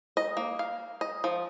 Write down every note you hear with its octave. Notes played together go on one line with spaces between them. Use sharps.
D#5
A#3
F5
D#5
F3